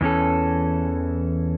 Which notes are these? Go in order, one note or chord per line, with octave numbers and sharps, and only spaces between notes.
E2 E3 C#4 A4